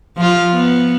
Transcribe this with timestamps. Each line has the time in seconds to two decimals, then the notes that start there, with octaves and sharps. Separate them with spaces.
0.17 F3 F4
0.54 B3